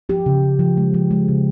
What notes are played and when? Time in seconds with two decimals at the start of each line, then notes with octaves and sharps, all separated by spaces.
0.09 F3 G4
0.26 C#3
0.43 C#3
0.59 F3
0.77 G#3
0.94 F3
1.11 G#3
1.28 C#3